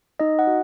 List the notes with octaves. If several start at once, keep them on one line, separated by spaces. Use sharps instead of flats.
D#4 D#5
F#5
F#4